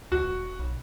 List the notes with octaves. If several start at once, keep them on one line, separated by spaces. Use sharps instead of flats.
D2 F#4
E1
B1